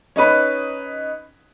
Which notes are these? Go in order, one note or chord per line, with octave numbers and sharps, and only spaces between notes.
C#4 D#4 B4 B5